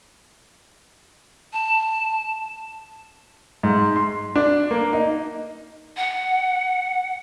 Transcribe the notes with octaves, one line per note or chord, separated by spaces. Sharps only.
A5
G#2
C6
D4
A#3
D#4
F#5